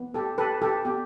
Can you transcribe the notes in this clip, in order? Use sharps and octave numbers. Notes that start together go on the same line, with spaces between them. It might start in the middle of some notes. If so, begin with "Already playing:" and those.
Already playing: B3
G4 A4
G4 A4 B4
G4 A4
B3 G4